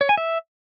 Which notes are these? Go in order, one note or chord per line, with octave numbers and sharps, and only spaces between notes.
C#5
G#5
E5